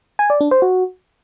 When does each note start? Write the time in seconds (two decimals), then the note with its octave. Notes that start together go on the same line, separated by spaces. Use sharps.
0.19 G#5
0.30 D5
0.41 D4
0.51 C5
0.62 F#4